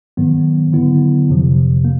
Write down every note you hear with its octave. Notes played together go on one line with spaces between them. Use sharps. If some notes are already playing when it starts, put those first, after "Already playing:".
G#2 D#3 F#3 B3
D3 F#3 B3 E4
F2 C3 F3
A#3